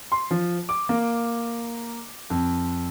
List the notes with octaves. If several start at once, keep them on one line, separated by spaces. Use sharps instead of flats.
C6
F3
D6
A#3
F2